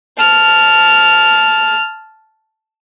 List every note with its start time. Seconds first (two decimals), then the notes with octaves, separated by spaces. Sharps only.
0.17 A5 F6